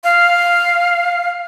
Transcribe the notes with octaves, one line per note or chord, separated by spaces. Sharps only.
F5